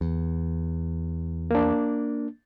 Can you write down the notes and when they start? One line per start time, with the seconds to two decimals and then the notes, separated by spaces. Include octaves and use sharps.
0.01 E2
1.51 A#3 D4